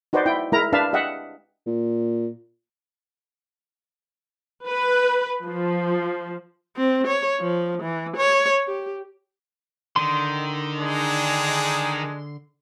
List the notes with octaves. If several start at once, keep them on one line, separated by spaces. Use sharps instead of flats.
D#4 F#4 B4 C5 D5
E4 G5
G#3 E4 A#4 A#5
D4 B4 E5 F5 A5
G4 D#5 E5 F#5
A#2
B4
F3
C4
C#5
F3
E3
C#5
G4
D3 D#3 C6
G#3 D4 G#4